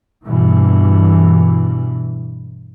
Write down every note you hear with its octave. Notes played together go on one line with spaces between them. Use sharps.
G2 B2 E3